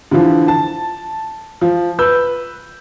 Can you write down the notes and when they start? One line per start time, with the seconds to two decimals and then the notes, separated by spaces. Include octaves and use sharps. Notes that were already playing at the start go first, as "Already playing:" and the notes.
0.11 D3 E3 F3
0.48 A5
1.61 F3
1.99 B4 E6 G6